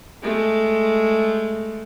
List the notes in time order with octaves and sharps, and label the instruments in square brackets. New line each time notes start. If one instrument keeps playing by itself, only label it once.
[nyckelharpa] G#3 A3